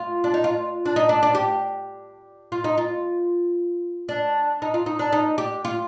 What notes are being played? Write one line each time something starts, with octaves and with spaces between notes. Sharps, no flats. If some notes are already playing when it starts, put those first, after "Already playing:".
Already playing: F4
D4
D#4
F4
D4
D#4
D4
D4
G4
F4
D#4
F4
D4
D#4
F4
D#4
D4
D#4
G4
F4